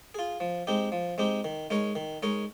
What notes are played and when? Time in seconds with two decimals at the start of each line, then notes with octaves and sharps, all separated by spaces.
0.14 F4 G#4
0.40 F3
0.67 G#3 C4 D#4 G4
0.92 F3
1.18 G#3 C4 D#4 G4
1.44 D#3
1.70 G#3 D#4 A#4 C#5
1.95 D#3
2.23 G#3 D#4 A#4 C#5